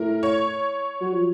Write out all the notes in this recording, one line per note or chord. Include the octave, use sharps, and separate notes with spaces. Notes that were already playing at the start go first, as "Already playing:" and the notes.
Already playing: A2 A#4
C#5
F#3
F3